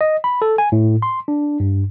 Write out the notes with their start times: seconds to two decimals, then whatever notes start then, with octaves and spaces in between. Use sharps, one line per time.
0.01 D#5
0.24 B5
0.42 A4
0.58 G#5
0.72 A2
1.02 C6
1.28 D4
1.60 G2